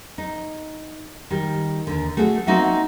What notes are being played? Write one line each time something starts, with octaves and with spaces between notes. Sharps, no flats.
D#4
D#3 G3 G4
D#2 D3
A3 F#4 G#4 A4
A#3 C4 D#4 F#4 E5 F#5